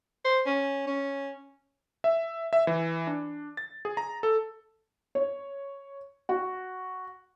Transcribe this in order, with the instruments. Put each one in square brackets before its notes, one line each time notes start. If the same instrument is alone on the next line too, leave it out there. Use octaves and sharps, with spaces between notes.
[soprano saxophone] C5
C#4
C#4
[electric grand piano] E5
E5
E3
D4
A6
G#4
A#5
A4
[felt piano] C#5
F#4